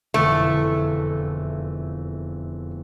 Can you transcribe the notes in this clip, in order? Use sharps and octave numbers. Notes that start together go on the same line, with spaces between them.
E1 F2 D3 A3